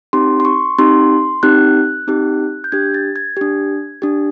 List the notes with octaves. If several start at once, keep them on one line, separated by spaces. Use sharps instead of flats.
C4 D#4 G4 C6
C6
C#6
C4 D#4 G4 C6
C4 D#4 G4 F#6
C4 D#4 G4
G6
D4 G4 G#6
A6
G#6
D4 G4
D4 G4